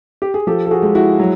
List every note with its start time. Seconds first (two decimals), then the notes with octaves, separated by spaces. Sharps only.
0.22 G4
0.34 G#4
0.47 F3 G4 A4
0.66 A4
0.71 F#4 G#4
0.83 G#3
0.95 E4 F#4
1.20 F#3